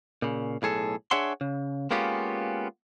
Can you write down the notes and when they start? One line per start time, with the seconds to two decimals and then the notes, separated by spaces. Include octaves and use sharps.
0.22 A#2 C#3
0.62 B1 A2 G#4 A4
1.11 D4 G#4 C#5 E5 F#5 C6
1.41 C#3
1.91 G#3 A#3 B3 C#4 F4 G4